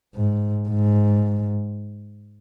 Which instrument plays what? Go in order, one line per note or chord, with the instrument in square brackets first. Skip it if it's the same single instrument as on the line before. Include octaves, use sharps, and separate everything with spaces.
[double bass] G#2
G#2